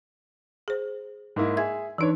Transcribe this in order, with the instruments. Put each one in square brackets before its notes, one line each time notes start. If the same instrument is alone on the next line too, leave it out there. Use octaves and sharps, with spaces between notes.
[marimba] G#4 C5
[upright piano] G#2 A#3 E4
[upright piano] G#4 E5 [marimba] G#6
[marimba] E3 D#4 [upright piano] D4 B4 C#5